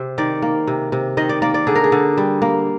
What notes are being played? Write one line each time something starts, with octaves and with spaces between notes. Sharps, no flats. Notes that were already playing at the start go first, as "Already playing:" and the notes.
Already playing: C3 C5
D#3 D5
A#3
C3
C3
D#3 D#5
D5
A#3 D5
D5
D3 G#4
A#4
G#4
D3
G3
A#3